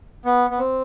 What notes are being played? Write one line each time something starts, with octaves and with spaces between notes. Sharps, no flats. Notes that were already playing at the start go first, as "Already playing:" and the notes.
B3
B3
C4